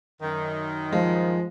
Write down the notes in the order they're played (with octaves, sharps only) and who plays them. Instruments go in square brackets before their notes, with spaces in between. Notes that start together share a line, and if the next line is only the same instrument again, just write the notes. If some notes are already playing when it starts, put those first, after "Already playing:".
[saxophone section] F#2 D#3
[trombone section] F3 [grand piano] G#3